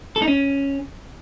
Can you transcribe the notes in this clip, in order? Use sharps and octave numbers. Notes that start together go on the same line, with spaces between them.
A4
D#4
C#4